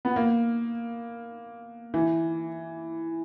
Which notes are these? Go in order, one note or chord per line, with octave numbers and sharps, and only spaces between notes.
B3
A#3
E3